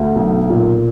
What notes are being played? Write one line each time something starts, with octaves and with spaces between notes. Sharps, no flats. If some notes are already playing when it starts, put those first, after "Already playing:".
Already playing: D2
B1
A#2